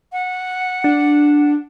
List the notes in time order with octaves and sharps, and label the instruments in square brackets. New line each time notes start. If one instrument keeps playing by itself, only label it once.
[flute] F#5
[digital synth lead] D4